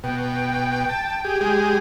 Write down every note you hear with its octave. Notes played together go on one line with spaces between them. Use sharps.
B2 G5
A5
G4 G#4
G#3 G4 G#4